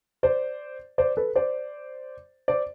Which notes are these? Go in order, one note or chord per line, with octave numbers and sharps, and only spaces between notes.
C5 D5
C5 D5
A4 B4
C5 D5
C5 D5